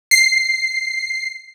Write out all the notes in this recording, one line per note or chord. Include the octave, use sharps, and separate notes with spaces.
C7